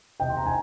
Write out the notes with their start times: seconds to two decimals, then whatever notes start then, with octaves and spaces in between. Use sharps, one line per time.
0.20 C3 D#5 G5
0.30 C6
0.37 A#5
0.46 G#5